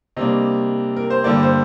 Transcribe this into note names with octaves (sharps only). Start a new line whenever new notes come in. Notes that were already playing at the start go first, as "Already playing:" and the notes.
C3 G3 A#3 D4 D#5
A#4
C5
G2 D3 G3 A#3 D5
C5